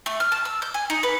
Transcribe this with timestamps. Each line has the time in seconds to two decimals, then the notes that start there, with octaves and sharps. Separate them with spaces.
0.06 A3
0.20 F6
0.32 A5
0.45 E6
0.62 G6
0.74 G#5
0.90 D#4
1.03 B4